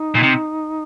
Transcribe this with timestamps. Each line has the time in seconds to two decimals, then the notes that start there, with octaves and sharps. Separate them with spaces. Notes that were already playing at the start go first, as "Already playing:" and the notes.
Already playing: D#4
0.15 A#2
0.23 C3